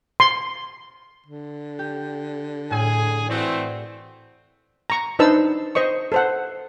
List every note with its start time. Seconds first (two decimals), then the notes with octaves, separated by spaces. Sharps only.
0.20 C6
1.26 D3
1.79 G4
2.71 A2 G#4 G#5
3.29 E3 A3 C4 F#4 G#4 D5
4.90 A#5 C#6
5.19 D4 D#4 B4 C5 A5 E6
5.75 C5 D#5 C#6
6.12 A4 C5 F#5